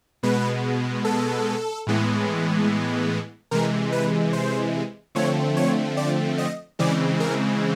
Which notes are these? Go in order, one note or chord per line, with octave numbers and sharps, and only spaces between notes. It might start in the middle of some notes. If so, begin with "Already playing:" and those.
B2 G#3 B3 B4
A4
A2 E3 G#3 B3
C3 E3 G#3 A#4
B4
C5
D3 F3 A3 C4 C#5
C#5
D5
D#5
C#3 E3 G#3 C4 D5
A#4